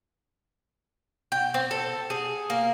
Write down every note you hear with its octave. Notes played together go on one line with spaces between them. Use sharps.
G5
C4
A4
G#4
A#3